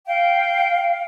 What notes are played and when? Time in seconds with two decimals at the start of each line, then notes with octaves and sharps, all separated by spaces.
0.07 F5 G5